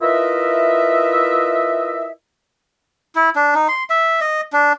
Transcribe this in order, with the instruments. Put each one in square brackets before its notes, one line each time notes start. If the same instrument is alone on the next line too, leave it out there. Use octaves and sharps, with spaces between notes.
[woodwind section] E4 F4 A#4 B4 D#5 E5
[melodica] E4
D4
D#4
C6
E5
D#5
D4